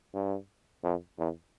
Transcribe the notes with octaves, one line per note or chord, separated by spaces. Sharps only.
G2
F2
E2